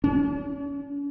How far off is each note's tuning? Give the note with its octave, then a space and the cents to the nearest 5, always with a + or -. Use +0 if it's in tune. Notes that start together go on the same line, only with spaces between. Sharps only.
C#4 +45